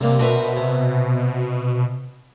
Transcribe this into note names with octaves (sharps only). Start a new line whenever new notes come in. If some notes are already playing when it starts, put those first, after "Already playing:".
C3 G3 A#3 D5
B2 C4 D4 A#4 B4 E5
C3